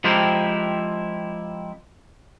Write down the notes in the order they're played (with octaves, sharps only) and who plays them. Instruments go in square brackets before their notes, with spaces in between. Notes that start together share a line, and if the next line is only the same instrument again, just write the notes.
[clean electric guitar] F3 G#3 C4 E4 G4 A#4